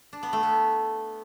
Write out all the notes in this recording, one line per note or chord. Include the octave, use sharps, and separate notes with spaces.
D4
B3
A3
B3